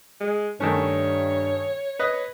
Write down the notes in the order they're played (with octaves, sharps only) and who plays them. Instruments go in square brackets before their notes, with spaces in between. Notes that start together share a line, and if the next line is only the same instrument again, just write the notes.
[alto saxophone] G#3
[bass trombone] G2 [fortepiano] D#3 A3 C#4 [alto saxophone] C#5
[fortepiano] B4 D#5